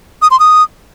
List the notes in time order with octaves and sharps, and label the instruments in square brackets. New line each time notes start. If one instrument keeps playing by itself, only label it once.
[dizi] D#6
C6
D#6